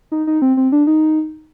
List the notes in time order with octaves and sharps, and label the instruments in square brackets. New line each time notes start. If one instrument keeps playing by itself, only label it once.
[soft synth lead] D#4
D#4
C4
C4
D4
D#4